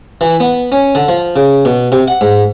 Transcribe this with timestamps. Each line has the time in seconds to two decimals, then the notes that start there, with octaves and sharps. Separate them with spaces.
0.21 E3
0.40 B3
0.72 C#4
0.95 D3
1.08 F3
1.36 C#3
1.65 B2
1.92 C3
2.08 F#5
2.21 G#2